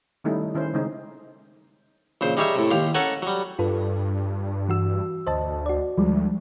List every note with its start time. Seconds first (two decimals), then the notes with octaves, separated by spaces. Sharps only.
0.24 D#3 G3 A3 C#4 D#4 E4
0.54 D#3 C#4 E4 C5
0.74 C#3 G#3 C4 D#4
2.21 A#1 C#3 C5 C6
2.37 G3 D#4 G4 G#4 C#5 E5
2.55 A2 C3
2.71 D#2 G4 F5 C6
2.94 C#4 A4 A#4 F#5 G#5
3.22 F#3 G3
3.59 G2 F4 A4 B4
4.68 E3 F#4 E6
5.27 D2 C5 D#5 A5
5.66 F#4 D5
5.98 D2 F3 G3 G#3